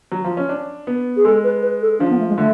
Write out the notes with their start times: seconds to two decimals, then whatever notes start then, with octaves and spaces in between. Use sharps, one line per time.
0.12 F#3
0.24 F3
0.37 C#4
0.49 D4
0.87 B3
1.17 G#4
1.25 G#3 A4
1.44 B4
1.62 B4
1.82 A4
1.99 F3 D4
2.10 B3
2.19 A3
2.28 G#3
2.38 D3 A3